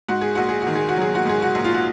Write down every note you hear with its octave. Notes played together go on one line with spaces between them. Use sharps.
G#2 F#4
G#4
A#1 F#4
G#4
D#3 F#4
G#4
F#4
F#3
G#4
F#4
G#2 G#4
F#4
A#1
F4
F#4